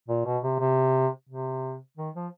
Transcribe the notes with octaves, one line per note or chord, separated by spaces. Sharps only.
A#2
B2
C3
C3
C3
D#3
F3